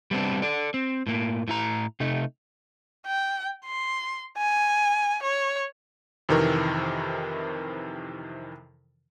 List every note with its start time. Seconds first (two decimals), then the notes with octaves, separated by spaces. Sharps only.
0.11 G3 B3 C4 D4
0.42 A4 D5
0.74 C4
1.07 A2 A#3
1.48 A2 E4 A#5
2.00 C3 A3 D#4
3.06 G5
3.65 C6
4.37 G#5
5.23 C#5
6.29 F2 C3 D#3 E3 A#4